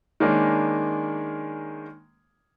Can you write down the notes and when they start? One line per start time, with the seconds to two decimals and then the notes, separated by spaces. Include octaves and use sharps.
0.20 D#3 G#3 A#3 C#4 D4